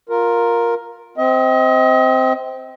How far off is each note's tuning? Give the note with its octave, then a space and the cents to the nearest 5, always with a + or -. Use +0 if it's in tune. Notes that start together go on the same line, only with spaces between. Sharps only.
F4 +10 A#4 +0
C4 -5 D#5 +35